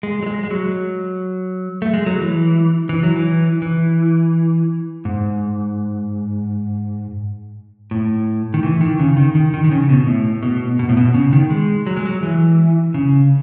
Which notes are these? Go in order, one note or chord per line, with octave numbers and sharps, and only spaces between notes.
G#3
F#3
G#3
G#3
F#3
A3
G#3
F#3
E3
E3
F#3
E3
E3
G#2
A2
D#3
E3
D#3
C#3
D#3
D#3
D#3
D#3
C#3
B2
A2
B2
B2
A2
B2
C#3
D#3
G#3
F#3
G#3
F#3
E3
C#3